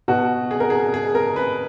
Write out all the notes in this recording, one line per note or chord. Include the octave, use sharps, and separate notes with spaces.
B2 F#4
G#4
A#4
G#4
G#4
A#4
B4